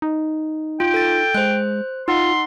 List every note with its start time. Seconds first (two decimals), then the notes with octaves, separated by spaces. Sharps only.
0.02 D#4
0.80 F4 G5
0.94 A4 A6
1.35 G#3 C5 F#6
2.08 D#4 F4 F#5 C6